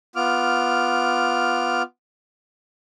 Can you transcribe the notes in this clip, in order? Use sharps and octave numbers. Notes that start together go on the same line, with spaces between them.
B3 F4 D6 F6